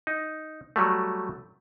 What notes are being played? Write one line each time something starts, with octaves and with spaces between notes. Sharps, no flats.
D#4
F#3 G3 A3